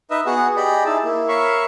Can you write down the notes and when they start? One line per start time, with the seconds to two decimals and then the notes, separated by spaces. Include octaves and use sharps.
0.11 D#4 B4 D#5 E5
0.26 B3 F#4 G#4 F#5
0.56 G4 G#4 D5 D#5 B5
0.85 D#4 E4 G#4 A5
1.03 A#3 E4
1.28 A#4 C#5 E5 F5 B5 C#6